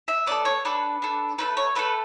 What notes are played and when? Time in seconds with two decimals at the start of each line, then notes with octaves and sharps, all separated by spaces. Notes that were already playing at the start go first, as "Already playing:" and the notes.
0.08 E5
0.26 B3 D4 A4 D5
0.45 C#5
0.65 D4 A4 B4
1.02 D4 A4
1.38 A3 E4 A4 B4
1.57 C#5
1.75 A3 E4 A4 B4